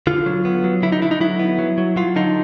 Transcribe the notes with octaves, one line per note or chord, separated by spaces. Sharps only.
D3 F4
F#3
B3
F#3
D3 E4
D#4
D3 E4
D#4
F#3 E4
B3
F#3
F#3
F#3 F4
D3 D#4